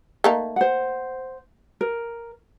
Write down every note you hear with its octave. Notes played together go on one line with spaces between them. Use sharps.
A3 A#3 D#4
C5 F#5
A#4